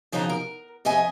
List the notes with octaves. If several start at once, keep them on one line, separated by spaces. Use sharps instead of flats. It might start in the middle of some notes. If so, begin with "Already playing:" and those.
C#3 F3 F#3 D#4 A#5
A#4
F2 D#5 E5 G#5